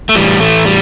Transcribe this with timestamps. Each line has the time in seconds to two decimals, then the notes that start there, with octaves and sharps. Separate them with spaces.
0.09 A3
0.15 A2 E3 G3
0.40 A3
0.65 G3